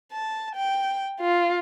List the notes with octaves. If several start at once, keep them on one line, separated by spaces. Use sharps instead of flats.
A5
G5
F4